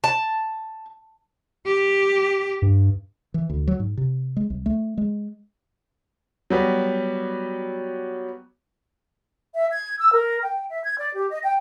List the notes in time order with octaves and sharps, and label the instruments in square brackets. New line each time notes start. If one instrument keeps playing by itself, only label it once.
[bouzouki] A5
[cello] G4
[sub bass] G2
[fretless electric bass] E3
D2
F#3
G#2
C3
G#3
C2
A3
G#3
[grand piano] F#3 G3 B3
[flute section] E5
G#6
E6
A#4
G5
E5
G#6
D5
G4
D#5
G5